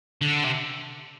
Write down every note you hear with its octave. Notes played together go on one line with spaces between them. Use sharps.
D3
C3